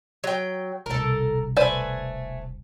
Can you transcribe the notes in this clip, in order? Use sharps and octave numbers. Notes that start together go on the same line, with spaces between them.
F#3 G5
E1 C2 A4 A#4
A3 B4 C5 D5 G#5